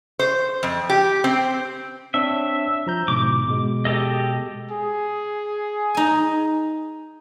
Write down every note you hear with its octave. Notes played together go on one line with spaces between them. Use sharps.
C5
F2
G4
C4
C4 D4 C#5 E5
F3 A#5 G6
G#2 B2 D3 D6
B2 G#3
G4 A4 D#5
G#4
D#4 G#5